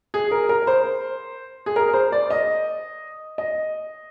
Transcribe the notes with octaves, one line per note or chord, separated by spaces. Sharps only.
G#4
A#4
A#4
C5
G#4
A#4
C5
D5
D#5
D#5